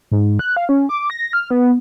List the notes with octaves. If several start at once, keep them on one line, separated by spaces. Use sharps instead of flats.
G#2
F#6
F5
C#4
D6
A#6
F6
B3